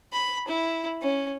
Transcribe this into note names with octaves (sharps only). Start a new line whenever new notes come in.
B5
E4
C#4